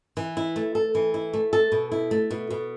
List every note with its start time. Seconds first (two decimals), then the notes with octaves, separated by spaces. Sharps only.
0.17 E3
0.37 E4
0.56 A3
0.75 A4
0.95 E3
1.14 E4
1.34 A3
1.53 A4
1.72 B2
1.92 E4
2.11 A3
2.31 B2
2.50 B2